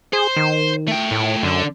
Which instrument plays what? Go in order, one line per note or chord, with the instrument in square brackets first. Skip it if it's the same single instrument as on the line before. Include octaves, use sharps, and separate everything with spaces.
[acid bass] G#4 [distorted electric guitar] C5
[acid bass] D#3
[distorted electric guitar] A3 G5
[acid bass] A2
[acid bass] F#2 [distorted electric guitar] D3